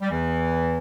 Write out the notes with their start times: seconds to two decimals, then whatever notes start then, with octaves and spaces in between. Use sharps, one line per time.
0.01 G3
0.10 E2 E3